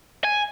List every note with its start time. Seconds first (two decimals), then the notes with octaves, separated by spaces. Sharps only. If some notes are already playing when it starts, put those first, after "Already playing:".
0.24 G#5